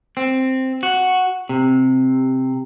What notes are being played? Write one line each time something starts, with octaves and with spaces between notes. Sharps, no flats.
C4
F#4
C3